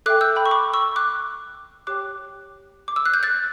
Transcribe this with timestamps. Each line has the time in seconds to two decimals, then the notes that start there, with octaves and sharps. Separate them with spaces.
0.06 A4 E5 G5 D6 F#6
0.21 E6 G6
0.36 G5 B5
0.46 C#6
0.51 B5 D6
0.73 C#6 E6
0.96 D6 F#6
1.87 G4 C#5 G5 D6 F#6
2.88 D6
2.96 E6
3.06 F#6
3.14 G6
3.23 F#6 A6